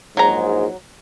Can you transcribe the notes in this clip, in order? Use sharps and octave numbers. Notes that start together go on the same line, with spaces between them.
A#1 G#2 F#3 A#5